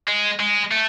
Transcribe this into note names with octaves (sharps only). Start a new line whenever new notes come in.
G#3
G#3
A3